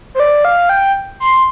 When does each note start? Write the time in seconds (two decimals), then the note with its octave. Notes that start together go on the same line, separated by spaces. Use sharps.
0.15 C5
0.20 D5
0.45 F5
0.69 G5
1.20 C6